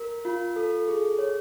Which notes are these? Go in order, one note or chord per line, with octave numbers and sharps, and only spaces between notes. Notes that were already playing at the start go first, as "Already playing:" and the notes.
Already playing: A#4
F4
A4
G#4
C#5